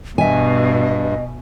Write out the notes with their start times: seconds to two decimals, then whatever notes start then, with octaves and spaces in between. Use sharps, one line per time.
0.18 G2 B2 D#5 E5 G#5